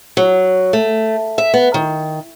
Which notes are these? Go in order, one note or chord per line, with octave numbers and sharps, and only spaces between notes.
F#3
A3
E5
B3
D#3